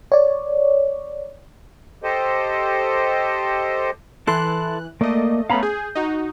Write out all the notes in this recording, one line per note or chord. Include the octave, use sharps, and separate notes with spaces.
C#5 D5
G4 A4 C5 D#5
E3 E4 A4 C6 F#6
A3 A#3 D5 D#5
A3 B3 C#4 F5 A#5 B5
G#4 G6
D#4 F#4